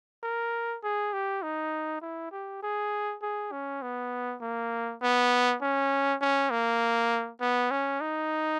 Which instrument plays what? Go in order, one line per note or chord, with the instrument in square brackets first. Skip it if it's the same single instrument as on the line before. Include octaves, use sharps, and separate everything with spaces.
[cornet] A#4
G#4
G4
D#4
E4
G4
G#4
G#4
C#4
B3
A#3
B3
C#4
C#4
A#3
B3
C#4
D#4